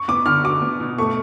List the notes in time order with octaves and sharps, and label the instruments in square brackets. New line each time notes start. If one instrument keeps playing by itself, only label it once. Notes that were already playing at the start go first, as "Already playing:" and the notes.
Already playing: [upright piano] C#6
[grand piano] B3 [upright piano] D6
[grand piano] D3 [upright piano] F6
[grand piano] F#4 [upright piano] D6
[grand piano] B3
B2
[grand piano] A3 [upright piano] C#6